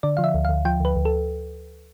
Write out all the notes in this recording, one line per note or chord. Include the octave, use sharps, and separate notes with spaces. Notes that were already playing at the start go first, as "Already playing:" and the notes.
D3 D5
F3 F5
E5
D2
F5
D2
F3 G5
D2 B4
D2
A4